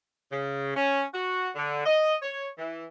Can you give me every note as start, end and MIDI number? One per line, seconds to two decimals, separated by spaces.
0.31 0.73 49
0.75 1.02 61
1.13 1.49 66
1.56 1.85 50
1.85 2.14 75
2.22 2.47 73
2.58 2.83 52